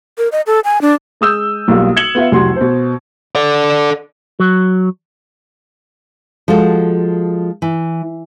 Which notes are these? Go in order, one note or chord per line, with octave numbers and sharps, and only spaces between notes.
A#4
D#5
A4
G#5
D4
G#3 D#6 E6 G6
B1 G3 A#3 F4
G#6 C#7 E7 F#7 G7
B3 F4 E5
F1 C2 F#3 F#4 C6
B2 C5
A4 D5
F#3
F3 G#3 F#4 A4
E3